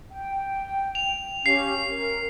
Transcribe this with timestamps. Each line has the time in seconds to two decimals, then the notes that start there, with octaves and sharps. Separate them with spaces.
0.12 G5
0.95 F7
1.46 C#4 G4 F5 C7
1.89 A#4